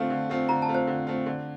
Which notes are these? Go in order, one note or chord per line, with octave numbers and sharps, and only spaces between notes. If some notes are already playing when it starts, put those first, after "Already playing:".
Already playing: D3 A3 C4 F4
D3
A3 C4 F4
D3 A#5
A5
A3 C4 F4
C5
D3
A3 C4 F4
D3